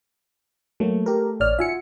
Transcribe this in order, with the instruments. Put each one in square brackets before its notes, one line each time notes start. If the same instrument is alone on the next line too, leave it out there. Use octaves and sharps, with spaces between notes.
[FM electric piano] F#3 A#3 [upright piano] A3
[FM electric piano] G4 A#4
[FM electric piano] A1 D5 F6 [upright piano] C#5
[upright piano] F4 F#4 [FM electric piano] E5 G#5 C#7